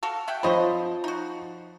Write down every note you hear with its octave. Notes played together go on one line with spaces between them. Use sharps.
F#4 A4 F5
E5 F#5 G5
F3 C4 C5 C#5 D#5 B5
D#4 F#4